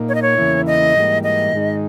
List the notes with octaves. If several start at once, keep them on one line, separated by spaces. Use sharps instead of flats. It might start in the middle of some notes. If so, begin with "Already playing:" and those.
Already playing: A#2 A#3 D#4
C#5
D#5
C#5
E2 C#3 E3 A#3 E4
D#5
G#2 E3 G3 A#3
D#5
G#2 D#3 G#3 D#4